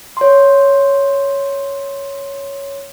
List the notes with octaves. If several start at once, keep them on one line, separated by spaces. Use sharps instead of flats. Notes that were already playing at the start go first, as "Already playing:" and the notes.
C#5 C6